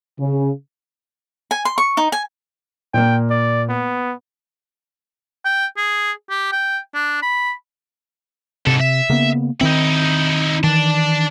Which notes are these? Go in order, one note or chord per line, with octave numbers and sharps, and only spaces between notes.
C#3
G#5
C6
C#6
D#4
G#5
A#2 A#3 G5
D5
B3
G5
G#4
G4
G5
D4
B5
G#2 C3 A4
E5
C#3 A#3 B3
D#3 C4 D#4 E4
D#3 E3 D5 A5